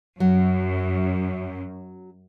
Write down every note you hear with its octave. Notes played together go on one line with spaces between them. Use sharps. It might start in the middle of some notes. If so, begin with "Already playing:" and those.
F#2 F#3